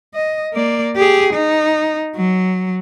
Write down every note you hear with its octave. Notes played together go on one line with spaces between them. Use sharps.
D#5
A#3 D5
G4 G#4
D#4
F#3